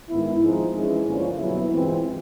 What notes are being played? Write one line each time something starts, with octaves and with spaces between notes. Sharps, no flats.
G#2 D#3 G#3 B3 E4
G#2 F3 G#3 C4 D#4
E3 G#3 C#4
G2 D3 F3 A#3 C#4
B2 F#3 B3 E4
G2 E3 G#3 C4 F4